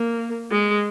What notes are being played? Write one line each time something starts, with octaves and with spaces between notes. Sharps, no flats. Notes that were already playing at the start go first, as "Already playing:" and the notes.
Already playing: A#3
G#3